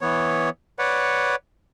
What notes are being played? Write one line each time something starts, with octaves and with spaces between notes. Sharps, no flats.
E3 B3 C#5
B4 C#5 D5 F#5